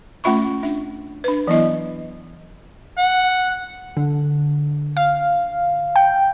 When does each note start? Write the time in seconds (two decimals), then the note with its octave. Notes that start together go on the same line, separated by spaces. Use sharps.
0.24 A3 C#4 F4 E5 B5 C#6
0.63 D4 E5
1.24 D4 B4
1.47 E3 F#3 B3 E4 D#5
2.98 F#5
3.97 D3
4.97 F5
5.96 G5